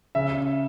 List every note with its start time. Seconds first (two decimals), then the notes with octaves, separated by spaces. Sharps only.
0.15 C#3 E5